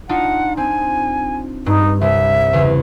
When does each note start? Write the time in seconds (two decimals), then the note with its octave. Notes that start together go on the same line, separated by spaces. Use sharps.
0.09 D4 D#4 F4 F#5
0.57 C4 G#5
1.66 G2 D#4
2.01 C2 E5
2.53 E2 C#3